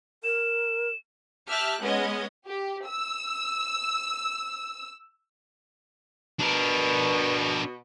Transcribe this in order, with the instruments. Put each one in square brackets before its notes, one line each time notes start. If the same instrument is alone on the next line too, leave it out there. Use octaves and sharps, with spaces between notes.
[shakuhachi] A#4 [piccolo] E7
[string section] G4 E5 A5 F6 F#6
G#3 B3 C#4 D#5
[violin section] G4
E6
[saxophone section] B2 [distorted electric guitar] D4 A#4